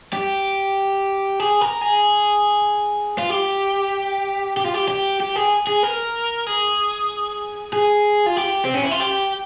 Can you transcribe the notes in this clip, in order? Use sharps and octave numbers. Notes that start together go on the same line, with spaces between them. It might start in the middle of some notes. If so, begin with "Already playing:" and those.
G4
G#4
A#4
G#4
F4
G4
G4
F4
G4
G4
G4
G#4
G#4
A#4
G#4
G#4
F4
G4
C4
C#4
E4
F4
G4